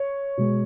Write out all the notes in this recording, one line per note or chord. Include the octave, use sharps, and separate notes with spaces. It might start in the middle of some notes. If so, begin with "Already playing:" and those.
Already playing: C#5
B2 G#3